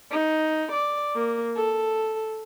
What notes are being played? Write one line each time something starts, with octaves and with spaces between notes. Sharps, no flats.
D#4
D5
A#3
A4